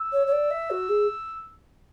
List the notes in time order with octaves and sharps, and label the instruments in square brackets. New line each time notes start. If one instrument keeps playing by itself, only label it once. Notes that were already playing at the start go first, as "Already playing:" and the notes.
Already playing: [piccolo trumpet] E6
[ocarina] C#5
C#5
D5
E5
F#4
G#4